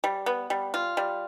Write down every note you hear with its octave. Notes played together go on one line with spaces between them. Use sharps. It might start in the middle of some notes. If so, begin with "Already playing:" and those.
G3
B3
G3
F4
G3